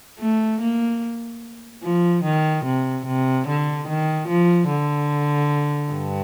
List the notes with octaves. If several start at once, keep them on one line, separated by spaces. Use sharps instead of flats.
A3
A#3
F3
D#3
C3
C3
D3
D#3
F3
D3
G2